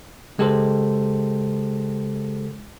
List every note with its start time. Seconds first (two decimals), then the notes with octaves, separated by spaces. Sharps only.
0.38 C#3 G#3 G4 A4 A#4 C5